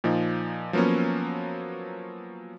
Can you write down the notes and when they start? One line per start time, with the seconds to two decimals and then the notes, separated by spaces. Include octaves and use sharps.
0.04 A#2 F3 D#4
0.73 F3 F#3 A#3 B3 C#4